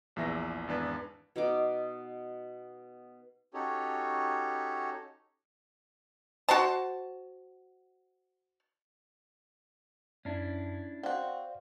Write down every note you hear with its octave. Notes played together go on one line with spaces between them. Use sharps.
A#1 E2 E3 E5 A#6
G#1 E2 D4 B4
B2 D#4 D6
C#4 D#4 F#4 G4 A4 C#5
F#4 C5 A5
F#2 C#4 D4 E4
C4 F#4 C5 D5 F5